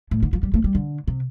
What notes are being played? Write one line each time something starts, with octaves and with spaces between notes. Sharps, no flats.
A2
D3
F3
G3
A3
G3
D3
C3